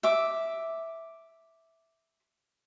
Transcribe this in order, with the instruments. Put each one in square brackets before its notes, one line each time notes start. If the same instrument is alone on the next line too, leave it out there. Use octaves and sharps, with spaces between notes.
[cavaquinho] E5 D6